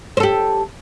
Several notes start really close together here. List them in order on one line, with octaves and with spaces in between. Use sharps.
C5 A4 G4